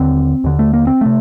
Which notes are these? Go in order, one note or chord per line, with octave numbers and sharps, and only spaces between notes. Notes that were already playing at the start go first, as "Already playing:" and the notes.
Already playing: D#2 D3 C4
D#2 D3
A3
A#3
C4
C3 A3